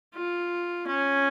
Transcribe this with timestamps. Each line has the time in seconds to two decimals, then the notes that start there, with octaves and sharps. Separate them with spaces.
0.15 F4
0.87 C#4